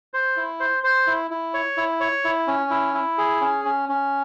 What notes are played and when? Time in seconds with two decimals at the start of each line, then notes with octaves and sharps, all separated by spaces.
0.14 C5
0.37 E4
0.60 C5
0.84 C5
1.07 E4
1.31 E4
1.54 C#5
1.77 E4
2.00 C#5
2.25 E4
2.47 C#4
2.71 E4
2.94 E4
3.18 G#4
3.41 C#4
3.65 C#4
3.89 C#4